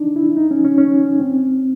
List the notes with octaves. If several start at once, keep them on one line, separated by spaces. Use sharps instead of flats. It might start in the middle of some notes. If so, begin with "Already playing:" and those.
Already playing: D4 D#4
E4
D#4
C#4
C#4
C#4
C4